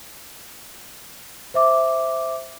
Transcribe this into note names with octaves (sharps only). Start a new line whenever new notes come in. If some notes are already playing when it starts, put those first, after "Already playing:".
C5 E5 D6